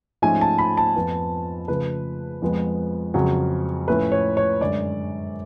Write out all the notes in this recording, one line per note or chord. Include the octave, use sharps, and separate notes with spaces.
G#2 F3 A3 C#4 G#5
A5
B5
A5
F2 F3 B3
C#3 F3 A3 B4
F2 F3 G#3 B3
F2 C#3 F#3
A2 F3 A3 C#4 B4
C#5
C#5
F#2 D3 G#3 D5